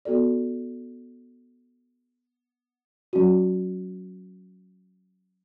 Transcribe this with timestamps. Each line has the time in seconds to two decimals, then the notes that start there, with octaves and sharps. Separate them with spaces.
0.05 B3 F#4 A4 D5
3.13 F#3 C#4 F#4